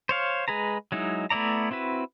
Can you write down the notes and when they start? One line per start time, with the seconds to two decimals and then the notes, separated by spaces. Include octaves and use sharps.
0.09 C5 C#5 F5
0.48 G#3 G#4 B4 A#5
0.92 F#3 G#3 D#4 E4
1.30 A3 B3 E4 D5 A#5
1.71 C4 E4 F#4 B4